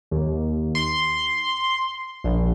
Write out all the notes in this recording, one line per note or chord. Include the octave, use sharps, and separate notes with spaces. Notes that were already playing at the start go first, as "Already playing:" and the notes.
D#2
C6
A#1